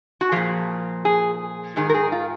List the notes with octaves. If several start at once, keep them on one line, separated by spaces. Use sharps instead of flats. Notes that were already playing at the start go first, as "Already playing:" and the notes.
F#4
A#2 F3 G#4
G#4
G#2 D#3 G#4
A#4
G#4
F4